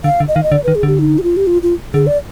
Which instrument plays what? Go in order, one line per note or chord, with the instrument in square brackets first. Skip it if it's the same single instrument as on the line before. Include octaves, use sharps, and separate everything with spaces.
[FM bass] D3 [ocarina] F5
[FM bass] D3
[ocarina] D#5
[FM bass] D#3 [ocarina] F5
[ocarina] D#5
[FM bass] D3 [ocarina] D5
[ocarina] B4
[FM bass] D#3
[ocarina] G#4
[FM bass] D3 [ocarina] G4
[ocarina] D#4
G4
F4
G4
F4
F4
[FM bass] D3 [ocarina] G#4
[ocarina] D5